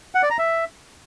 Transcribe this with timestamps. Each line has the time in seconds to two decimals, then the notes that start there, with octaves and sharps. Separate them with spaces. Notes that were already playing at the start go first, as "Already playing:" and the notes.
0.15 F#5
0.23 D5
0.30 A#5
0.38 E5